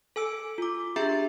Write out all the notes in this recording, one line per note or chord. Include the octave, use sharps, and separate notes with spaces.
A4 G#5 E6 D7
F4 D6
D4 G4 G#4 E5 A#5 A6